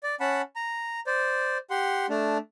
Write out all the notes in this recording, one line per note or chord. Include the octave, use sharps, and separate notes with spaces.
D5
C#4 F#5 A5 B5
A#5
C5 D5
G4 F#5 C6
A3 D4